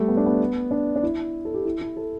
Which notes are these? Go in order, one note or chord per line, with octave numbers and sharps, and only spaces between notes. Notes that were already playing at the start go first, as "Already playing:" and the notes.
Already playing: G3 A3
B3
D4
B3
D4
D4
E4
A4
G4
E4
E4
A4